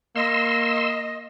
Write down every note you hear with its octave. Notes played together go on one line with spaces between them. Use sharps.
A#3 D#5 C6 E6